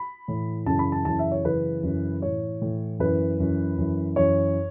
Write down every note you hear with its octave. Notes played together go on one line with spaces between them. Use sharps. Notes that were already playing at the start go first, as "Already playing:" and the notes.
Already playing: B5
A2 E3
F#2 C#3 E3 A5
B5
A5
F#2 C#3 E3 A5
E5
C#5
F#2 C#3 E3 B4
F#2 C#3 E3
A2 E3 C#5
A2 E3
F#2 E3 B4
F#2 E3
F#2 E3
F#2 E3 C#5